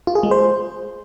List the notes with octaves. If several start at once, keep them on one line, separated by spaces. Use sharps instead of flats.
F4
G#4
G#3
C5